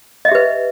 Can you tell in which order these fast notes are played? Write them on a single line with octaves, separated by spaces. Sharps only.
D#5 E5 G4 B4